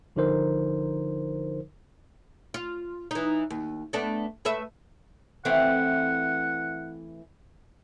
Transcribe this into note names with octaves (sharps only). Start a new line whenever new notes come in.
G#1 D3 F3 D#4 A#4 C5
F4
E3 D#4
D#2
A3 B3 D4
A3 B4 E5
E3 A3 C4 F#5